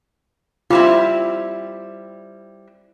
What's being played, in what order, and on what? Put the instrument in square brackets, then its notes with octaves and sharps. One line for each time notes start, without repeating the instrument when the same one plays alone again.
[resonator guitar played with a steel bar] G3 C4 E4 [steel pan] F4